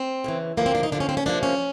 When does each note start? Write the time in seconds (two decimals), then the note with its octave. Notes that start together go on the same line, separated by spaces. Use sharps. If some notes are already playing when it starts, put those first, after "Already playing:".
Already playing: C4
0.24 E2 C#3 E3
0.57 D2 D3 F3 A#3 B3
0.66 C4
0.75 D4
0.83 D#4
0.92 D#2 D3 F3 D4
1.00 C#4
1.09 C4
1.17 C#4
1.26 C3 F3 A#3 D4
1.43 C#4